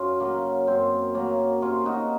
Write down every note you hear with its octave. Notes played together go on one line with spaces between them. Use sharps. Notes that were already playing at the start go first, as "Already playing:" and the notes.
Already playing: F#2 C#4 F4
C#3 F#3 A#3
F#2 C4
C#3 F#3 A#3 C#4
C3 C#4 F4
D#4 F#4